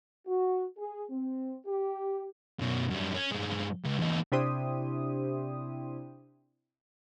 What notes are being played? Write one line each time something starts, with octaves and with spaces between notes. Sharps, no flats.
F#4
G#4
C4
G4
F#2 B2
F#2 G3
C#4
G2 G#3
C#2
E2 D#4
C3 D4 E4 G4 C5 D#6